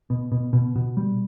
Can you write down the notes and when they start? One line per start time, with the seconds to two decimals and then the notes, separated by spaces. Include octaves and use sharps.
0.10 B2
0.32 B2
0.53 B2
0.76 B2
0.97 G3